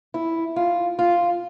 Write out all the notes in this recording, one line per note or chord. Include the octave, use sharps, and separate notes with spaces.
E4
F4
F4